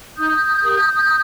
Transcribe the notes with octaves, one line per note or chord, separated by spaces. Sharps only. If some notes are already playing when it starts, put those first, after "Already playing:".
D#4 D#6 G6
G4 A#4